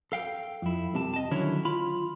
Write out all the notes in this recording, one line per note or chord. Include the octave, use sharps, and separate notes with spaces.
A4 F5 G5
F2 E4
C2 C3 A5
D#5 A5
D3 D#3 F#3 C#4 E4 C#5
F4 B5